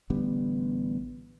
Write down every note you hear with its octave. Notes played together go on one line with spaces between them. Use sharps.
A1 D3 G3 B3